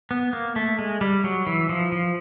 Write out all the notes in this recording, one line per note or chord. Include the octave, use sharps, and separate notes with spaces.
B3
A#3
A3
G#3
G3
F#3
E3
F3
F3